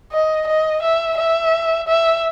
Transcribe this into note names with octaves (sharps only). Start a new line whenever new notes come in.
D#5
D#5
E5
E5
E5